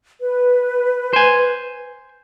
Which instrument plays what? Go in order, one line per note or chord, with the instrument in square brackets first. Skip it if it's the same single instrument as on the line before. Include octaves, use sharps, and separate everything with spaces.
[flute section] B4
[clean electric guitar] C5 G#5